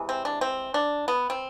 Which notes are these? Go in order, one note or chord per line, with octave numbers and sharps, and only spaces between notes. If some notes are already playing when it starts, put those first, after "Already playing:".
Already playing: C3 E3 G#3
C4
D4
C4
D4
B3
C4